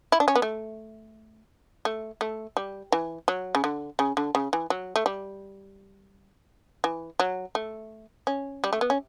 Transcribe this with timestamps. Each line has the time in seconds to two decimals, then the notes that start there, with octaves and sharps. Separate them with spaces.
0.12 E4
0.20 D4
0.28 C#4
0.36 B3
0.42 A3
1.85 A3
2.21 A3
2.57 G3
2.92 E3
3.28 F#3
3.55 C#3
3.64 D3
3.99 C#3
4.17 D3
4.35 C#3
4.53 E3
4.70 F#3
4.96 A3
5.06 G3
6.84 E3
7.20 F#3
7.55 A3
8.27 C#4
8.64 G3
8.73 A3
8.81 B3
8.90 C#4